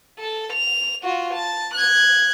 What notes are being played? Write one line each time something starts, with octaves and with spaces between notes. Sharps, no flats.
A4
F7
F4 F#4
A5
F#6 G#6